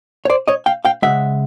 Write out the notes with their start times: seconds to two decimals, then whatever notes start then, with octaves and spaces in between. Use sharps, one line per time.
0.25 C#5
0.30 C5 D5
0.48 C#5 D#5
0.66 F5 G5
0.85 F5 G5
1.02 C#3 E3 G#3 E5 F#5